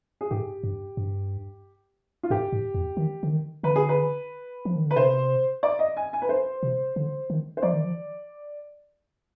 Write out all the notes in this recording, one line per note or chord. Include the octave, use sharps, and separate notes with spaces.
G#4
G#2 G4
G2
G2
F4
G#2 G4
G#2
F2
D#3
D3
D#3
D3 B4
G#4
B4
F3
D#3
D3 B4
C3 C5
D5
D#5
G#5
G#5
B4
C5
C3
D3
D#3
C5
F3 D5
D#3
F3